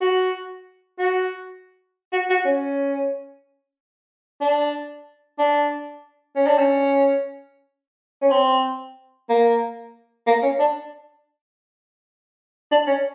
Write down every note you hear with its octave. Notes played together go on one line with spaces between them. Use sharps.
F#4
F#4
F#4
F#4
C#4
D4
D4
C#4
D4
C#4
C#4
C4
A#3
A#3
C#4
D4
D4
C#4